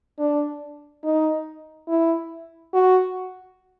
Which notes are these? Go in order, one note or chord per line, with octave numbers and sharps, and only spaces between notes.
D4
D#4
E4
F#4